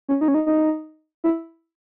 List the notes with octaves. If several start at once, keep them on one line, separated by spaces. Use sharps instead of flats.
C#4
D#4
C#4
D#4
D#4
E4